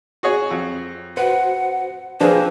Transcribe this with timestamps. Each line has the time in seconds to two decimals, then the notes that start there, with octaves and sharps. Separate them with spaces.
0.23 F#4 G#4 C#5
0.51 F2
1.17 F#4 B4 C5 F#5
2.21 F3 A#3 C4 D4 F4 G#4 B4 C5